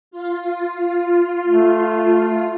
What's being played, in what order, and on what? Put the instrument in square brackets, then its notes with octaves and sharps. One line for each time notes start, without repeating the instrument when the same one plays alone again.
[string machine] F4
[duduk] A3